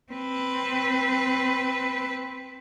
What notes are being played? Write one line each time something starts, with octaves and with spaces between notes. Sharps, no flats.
C4 B4